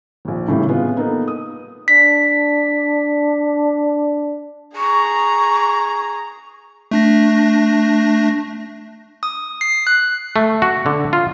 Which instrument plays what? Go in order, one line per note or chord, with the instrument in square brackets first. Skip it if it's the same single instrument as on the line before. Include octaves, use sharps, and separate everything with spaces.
[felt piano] A#1 D#2
A2 C#3 E3 G3
G#3 B3 C4 F4
A#3 B3 D#4 A4 A#4
D#6
[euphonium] D4 [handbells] B6
[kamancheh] G#4 A#5 [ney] C#6
[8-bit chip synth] A3 D4 A#6
[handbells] D#6
C7
F#6
[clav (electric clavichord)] A3
F#4
D3
F4